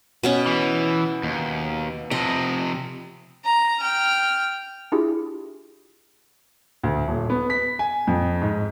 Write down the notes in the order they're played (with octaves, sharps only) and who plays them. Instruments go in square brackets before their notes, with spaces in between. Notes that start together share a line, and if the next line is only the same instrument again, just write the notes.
[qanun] B2 B3 C#4
[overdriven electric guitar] E3
D#2
[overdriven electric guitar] C3 F3 [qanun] D#5
[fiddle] A#5
G5 F6
[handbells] D4 E4 F4 G4 G#4
[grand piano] D2
D#1
B3
B6
G#5
F2
G#2